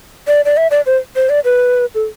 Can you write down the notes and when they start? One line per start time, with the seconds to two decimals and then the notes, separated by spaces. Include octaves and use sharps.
0.27 D5
0.45 D5
0.57 E5
0.71 D5
0.86 C5
1.16 C5
1.29 D5
1.44 B4
1.95 A4